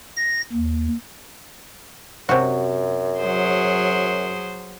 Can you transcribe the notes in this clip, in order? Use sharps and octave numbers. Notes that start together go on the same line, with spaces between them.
A#6
D#2
F#2 C3 F#4
F#3 G#4 C5